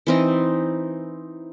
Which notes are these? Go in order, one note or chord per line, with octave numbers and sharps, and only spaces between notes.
E3 C4 D#4